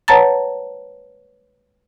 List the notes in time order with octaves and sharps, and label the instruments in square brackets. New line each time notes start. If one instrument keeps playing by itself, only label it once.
[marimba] B4 C#5 F#5 A5 A#5 A6